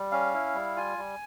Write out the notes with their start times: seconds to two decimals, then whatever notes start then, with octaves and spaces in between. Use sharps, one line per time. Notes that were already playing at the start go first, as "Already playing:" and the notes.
Already playing: G3
0.12 C#4 F5
0.34 E4
0.55 G3
0.76 F4 G#5
0.98 G3